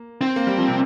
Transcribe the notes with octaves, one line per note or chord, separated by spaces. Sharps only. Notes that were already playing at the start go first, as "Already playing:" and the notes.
Already playing: A#3
C4
A#3
G3
F3
C3